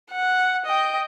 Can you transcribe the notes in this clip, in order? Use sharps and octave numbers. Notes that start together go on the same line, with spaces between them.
F#5
D#5 G5